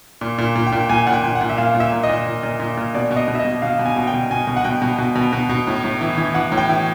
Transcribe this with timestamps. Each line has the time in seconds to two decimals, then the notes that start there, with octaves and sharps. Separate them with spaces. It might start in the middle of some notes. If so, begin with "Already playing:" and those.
0.21 A#2
0.38 A#2
0.56 A#2
0.67 G5
0.72 A#2
0.89 A#2 G#5
1.07 A#2 F#5
1.13 G5
1.24 A#2
1.35 F#5
1.41 A#2
1.49 E5
1.57 A#2 F5
1.74 A#2
1.80 E5
1.92 A#2
2.03 D#5
2.09 A#2
2.26 A#2
2.43 A#2
2.60 A#2
2.77 A#2
2.94 B2 D5
3.11 B2
3.16 D#5
3.28 B2
3.35 E5
3.39 D#5
3.45 B2
3.62 B2 F5
3.79 B2
3.86 G#5
3.96 B2
4.07 G5
4.13 B2
4.31 B2 G#5
4.47 B2
4.56 F#5
4.64 B2 G5
4.82 B2
4.98 B2
5.15 B2
5.33 B2
5.49 B2
5.67 A2
5.84 A2
6.01 E3
6.17 E3
6.34 E3 F#5
6.52 A2
6.57 G5
6.69 E3